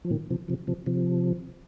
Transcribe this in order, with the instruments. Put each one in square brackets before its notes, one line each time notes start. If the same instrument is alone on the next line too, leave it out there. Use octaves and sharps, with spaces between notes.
[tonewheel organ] F3
A#2 D#3
C3 F3
C3 F3
C3 F3
C3 F3